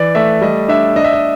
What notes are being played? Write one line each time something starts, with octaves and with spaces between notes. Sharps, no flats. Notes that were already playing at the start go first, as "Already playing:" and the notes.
Already playing: E3 D5
A3 E5
G3 D#5
D4 E5
D4 D#5
E5
D#5